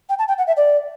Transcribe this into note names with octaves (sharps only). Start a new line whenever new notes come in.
G5
A5
G5
F#5
E5
D5